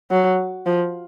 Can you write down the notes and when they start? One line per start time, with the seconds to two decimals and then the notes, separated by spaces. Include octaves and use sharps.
0.11 F#3
0.66 F3